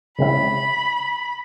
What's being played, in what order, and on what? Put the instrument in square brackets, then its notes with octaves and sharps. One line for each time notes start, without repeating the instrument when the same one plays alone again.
[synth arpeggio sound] C#3 G#3 C#4 E4 [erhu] B5